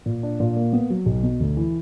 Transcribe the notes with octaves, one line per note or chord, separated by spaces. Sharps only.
A#2
D4
A#2
A#3
B3
F#3
B1
B2
D2
E3